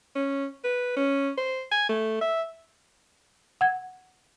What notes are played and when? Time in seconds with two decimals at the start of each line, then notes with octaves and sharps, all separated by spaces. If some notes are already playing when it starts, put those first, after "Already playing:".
0.15 C#4
0.64 B4
0.97 C#4
1.37 C5
1.72 G#5
1.89 A3
2.21 E5
3.61 F#5 G#6